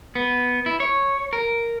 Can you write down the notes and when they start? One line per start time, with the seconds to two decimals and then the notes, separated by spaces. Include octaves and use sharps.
0.15 B3
0.66 E4
0.80 C#5
1.33 A#4